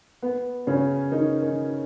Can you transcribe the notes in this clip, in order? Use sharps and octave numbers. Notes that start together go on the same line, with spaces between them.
B3
C#3 C#4
D#3 D#4
D#3 D#4